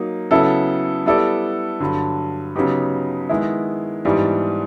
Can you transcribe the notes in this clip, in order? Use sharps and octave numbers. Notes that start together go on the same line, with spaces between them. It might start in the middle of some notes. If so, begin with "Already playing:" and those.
Already playing: F#3 A#3 D#4
C#3 F#3 B3 E4 A4
G3 B3 E4 A4 D5
G2 D3 F#3
C#3 F#3 B3 D#4 G4
D#3 G#3 B3 E4
G#2 E3 G3 B3 D4